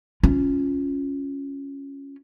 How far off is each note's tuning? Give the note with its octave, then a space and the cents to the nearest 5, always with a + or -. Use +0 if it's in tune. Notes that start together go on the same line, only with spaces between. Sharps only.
C#4 +0 F4 +0